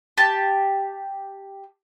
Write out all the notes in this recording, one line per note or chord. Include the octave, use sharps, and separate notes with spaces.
G4 A5